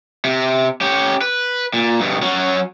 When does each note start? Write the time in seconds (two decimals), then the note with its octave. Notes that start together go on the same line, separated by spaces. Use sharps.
0.25 C3
0.81 C#4 G4
1.21 B4
1.74 A#2
2.00 G2 B2
2.22 F#3 C#4